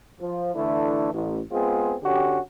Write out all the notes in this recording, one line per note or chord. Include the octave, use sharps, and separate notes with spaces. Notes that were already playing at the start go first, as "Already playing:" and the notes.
F3
D3 E3 A3 D4 E4
A1
G#3 B3 C4 F4 G#4
D3 C#4 F#4 G4